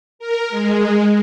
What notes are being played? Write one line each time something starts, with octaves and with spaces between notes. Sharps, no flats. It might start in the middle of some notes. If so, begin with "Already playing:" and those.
A#4
G#3